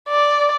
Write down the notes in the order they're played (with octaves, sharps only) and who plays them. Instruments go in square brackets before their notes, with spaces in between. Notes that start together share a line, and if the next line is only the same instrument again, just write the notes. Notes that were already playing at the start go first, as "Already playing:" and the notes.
[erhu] D5